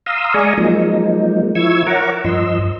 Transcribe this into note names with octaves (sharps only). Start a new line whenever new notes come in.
F5 A#5 C6 D#6 E6
G#3 D5 G#5 A#5 C#6 D#6
F3 F#3 G#3 A#3 D#4
F3 E4 C#6 E6 G#6
A#4 C#5 F#5 A#5 C#6 D6
G2 F3 D#5 C6 E6